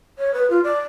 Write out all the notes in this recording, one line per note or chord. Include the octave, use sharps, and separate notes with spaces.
C#5
B4
F4
D5